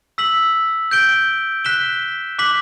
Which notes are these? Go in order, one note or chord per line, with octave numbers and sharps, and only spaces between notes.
E6 B6 F#7
G6 D7 G7
F#6 B6 E7 G7
D6 F#6 B6 F#7